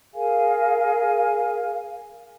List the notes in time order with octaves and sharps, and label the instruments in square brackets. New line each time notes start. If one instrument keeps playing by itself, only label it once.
[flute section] G#4 A#4 F5 G#5